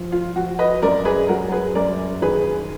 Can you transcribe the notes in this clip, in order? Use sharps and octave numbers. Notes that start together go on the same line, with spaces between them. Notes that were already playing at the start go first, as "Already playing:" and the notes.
Already playing: F3
F4
F3 F#4
B4 D#5
F#2 A#4 D5
G#4 B4
F#3 F#4 A#4
G#4 B4
F#2 A#4 D5
D#3 G#4 B4